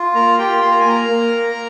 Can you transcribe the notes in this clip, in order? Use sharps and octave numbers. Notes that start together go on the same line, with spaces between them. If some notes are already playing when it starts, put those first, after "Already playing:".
Already playing: F4
A#3 A#4 A#5
F4 G4 G5
A#3 C6
A#5
G#5
A#3 A#4 A#5
A#3